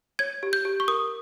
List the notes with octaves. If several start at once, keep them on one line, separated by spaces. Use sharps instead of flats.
C#5 G#6
G4
G6
G4
C#6
A#4 D#6